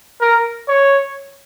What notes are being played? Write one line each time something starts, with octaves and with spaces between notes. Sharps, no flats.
A#4
C#5